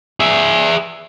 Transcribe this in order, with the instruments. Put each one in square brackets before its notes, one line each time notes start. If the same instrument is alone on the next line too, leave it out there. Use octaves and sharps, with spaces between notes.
[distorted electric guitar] G#4 E5